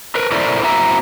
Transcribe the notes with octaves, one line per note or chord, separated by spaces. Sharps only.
A#4 B4
E4 A4 A#4 C5 D5 E5
A#3 C4 E4 F#4 E5 A#5